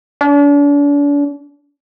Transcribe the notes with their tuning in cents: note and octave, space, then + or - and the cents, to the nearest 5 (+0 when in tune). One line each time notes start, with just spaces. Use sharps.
D4 -40